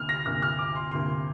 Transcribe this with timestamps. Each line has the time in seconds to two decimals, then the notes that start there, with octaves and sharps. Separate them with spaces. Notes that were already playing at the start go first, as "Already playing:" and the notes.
Already playing: D2 C3 A#3 F6
0.09 A#6
0.26 D2 C3 A#3 F6
0.42 F6
0.59 D6
0.75 C6
0.91 D2 C3 A#3 C6